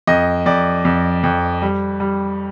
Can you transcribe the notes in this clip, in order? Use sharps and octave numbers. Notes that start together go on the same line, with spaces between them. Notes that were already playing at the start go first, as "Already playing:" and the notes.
F2 D#5
F2 D5
F2
F2
G3
G3